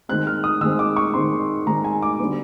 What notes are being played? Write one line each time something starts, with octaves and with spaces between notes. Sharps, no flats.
D#3 G#3 C4 F#6
F6
D#6
D#3 G#3 C4 E6
D6
C#6
D#3 G#3 C4 C6
D#3 G#3 C4 A#5
G#5
D6
D3 G3 B3